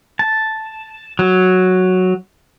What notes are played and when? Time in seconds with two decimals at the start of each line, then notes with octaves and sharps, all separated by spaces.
0.19 A5
1.19 F#3